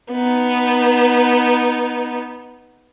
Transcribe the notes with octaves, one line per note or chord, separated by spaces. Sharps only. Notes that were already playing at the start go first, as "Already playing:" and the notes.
B3 D#4